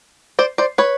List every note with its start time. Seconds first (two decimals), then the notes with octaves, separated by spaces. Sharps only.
0.39 C5 D5
0.58 C5 D5
0.78 B4 C#5